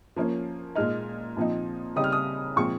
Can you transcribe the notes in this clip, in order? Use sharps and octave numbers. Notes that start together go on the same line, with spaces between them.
F3 A#3 C#4
A#2 G#3 D#4 F6
A#2 F3 C4 D#4
C#3 G3 C4 D#4 D#6
F6
D#6
A#2 F3 G#3 C4 C#6